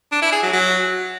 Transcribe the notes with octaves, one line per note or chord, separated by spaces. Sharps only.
D4
E4
G#4
F#3
F#3